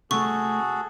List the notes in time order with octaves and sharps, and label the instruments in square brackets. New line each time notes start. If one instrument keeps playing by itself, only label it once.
[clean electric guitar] C3 A3 [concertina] F#4 G#4 A4 [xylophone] C#6